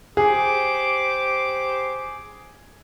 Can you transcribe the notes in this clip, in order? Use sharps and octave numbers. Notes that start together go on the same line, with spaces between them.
G4 G#4 C5 D6